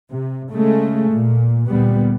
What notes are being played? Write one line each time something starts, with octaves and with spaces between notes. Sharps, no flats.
C3
C#3 G#3 A3
A#2
D2 A#2 G3 B3